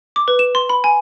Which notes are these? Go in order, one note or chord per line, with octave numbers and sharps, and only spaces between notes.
D6
B4
E7
C6
B5
G#5